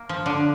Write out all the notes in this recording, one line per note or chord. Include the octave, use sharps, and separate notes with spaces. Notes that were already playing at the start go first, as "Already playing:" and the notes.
Already playing: A#3
F3
D3